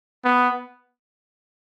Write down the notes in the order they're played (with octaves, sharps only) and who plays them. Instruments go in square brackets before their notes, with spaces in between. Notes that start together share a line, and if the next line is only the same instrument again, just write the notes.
[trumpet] B3